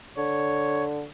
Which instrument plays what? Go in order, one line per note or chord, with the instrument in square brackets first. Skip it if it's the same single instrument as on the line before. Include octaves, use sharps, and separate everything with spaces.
[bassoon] D3 [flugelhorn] C#5